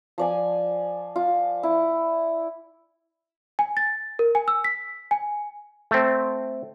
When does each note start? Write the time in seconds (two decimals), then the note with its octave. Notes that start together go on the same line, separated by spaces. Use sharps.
0.18 F3 D5 G#5
1.16 F4
1.63 E4
3.59 G#5
3.77 A6
4.19 A#4
4.35 G#5
4.48 E6
4.64 B6
5.11 G#5
5.91 A3 C4